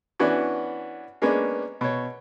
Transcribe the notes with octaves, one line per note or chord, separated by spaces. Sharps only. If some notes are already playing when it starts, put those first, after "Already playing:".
E3 B3 C#4 D4 F#4
G#3 A#3 B3 C#4 D4
B2 C#5